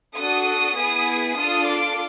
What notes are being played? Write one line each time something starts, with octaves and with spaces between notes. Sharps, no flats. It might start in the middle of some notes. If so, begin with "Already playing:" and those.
D4 F#4 A4 D#6
B3 E4 G#4
D4 F4 A4 D#6
D6